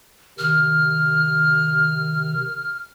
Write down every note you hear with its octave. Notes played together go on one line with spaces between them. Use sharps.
C3 D#3 F6